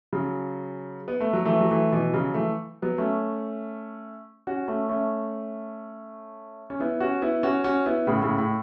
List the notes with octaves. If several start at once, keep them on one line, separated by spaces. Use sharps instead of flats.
C#3 F#3
B3
A3
F#3
E3 A3
F#3
E3 A3
B2 E3
C#3 F#3
E3 A3
F#3 B3
A3 C#4
C#4 F#4
A3 C#4
A3 C#4
C#4
B3 E4
C#4 F#4
B3 E4
C#4 F#4
C#4 F#4
B3 E4
A2 C#3
A2 C#3
A2